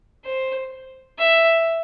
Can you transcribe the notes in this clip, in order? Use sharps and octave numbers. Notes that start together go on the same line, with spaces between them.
C5
E5